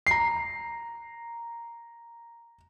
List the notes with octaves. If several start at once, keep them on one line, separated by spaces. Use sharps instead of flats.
A#5 C7